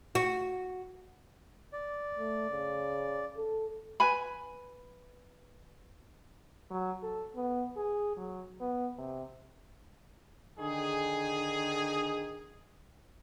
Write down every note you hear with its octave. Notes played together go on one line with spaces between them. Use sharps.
F#4
D5
A3
C#3
A4
B4 G#5 B5
F#3
A4
B3
G#4
F#3
B3
C3
D3 D#3 G#4